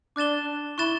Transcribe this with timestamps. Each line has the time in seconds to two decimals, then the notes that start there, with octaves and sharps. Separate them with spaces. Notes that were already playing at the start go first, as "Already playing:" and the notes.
0.16 D4 D6 F#6 A6 E7 G7
0.78 E4 C#6 F#6 A6 E7 G7